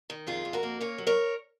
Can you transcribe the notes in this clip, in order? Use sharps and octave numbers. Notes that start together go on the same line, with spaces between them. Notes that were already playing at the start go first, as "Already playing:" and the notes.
D#3
F2 F4 G#4
F2
F#4 A#4
A#3
C#4 A#4 C#5
F#3
A#4 C#5